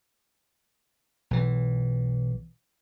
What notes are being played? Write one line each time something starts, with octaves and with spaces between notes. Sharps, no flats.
B1 E3